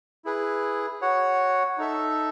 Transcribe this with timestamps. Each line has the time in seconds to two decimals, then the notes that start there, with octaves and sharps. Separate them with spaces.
0.25 E4 G#4 B4
1.01 F#4 C#5 F#5
1.78 D#4 A4 E5